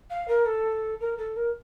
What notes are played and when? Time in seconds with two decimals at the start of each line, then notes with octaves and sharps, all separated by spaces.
0.10 F5
0.28 A#4
0.45 A4
1.00 A#4
1.17 A4
1.36 A#4